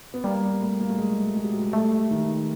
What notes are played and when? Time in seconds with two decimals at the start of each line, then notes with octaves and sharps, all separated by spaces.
0.14 B3
0.24 G3 A#3
0.61 A3
0.81 A#3
0.90 A3
0.98 G#3
1.36 G#3
1.44 G3
1.52 F#3
1.59 G3
1.73 G3 A3
2.11 D#3